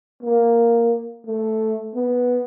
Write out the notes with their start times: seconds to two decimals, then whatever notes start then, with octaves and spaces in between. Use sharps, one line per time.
0.23 A#3
1.27 A3
1.95 B3